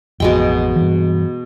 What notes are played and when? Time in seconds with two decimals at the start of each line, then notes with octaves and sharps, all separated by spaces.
0.20 A1 F2 B2 G#3 G5
0.76 G2 E3